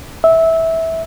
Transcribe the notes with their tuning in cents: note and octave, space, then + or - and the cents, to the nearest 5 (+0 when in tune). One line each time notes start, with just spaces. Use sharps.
E5 -15